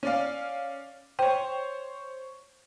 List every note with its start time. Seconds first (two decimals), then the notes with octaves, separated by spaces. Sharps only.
0.03 C#4 D5 F5
1.19 C5 C#5 G5